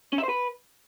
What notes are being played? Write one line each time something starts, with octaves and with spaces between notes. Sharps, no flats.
C#4
E5
C5
B4